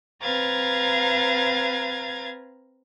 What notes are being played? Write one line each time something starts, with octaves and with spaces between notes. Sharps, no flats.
C4 B4 F5 A#5 G#6 A6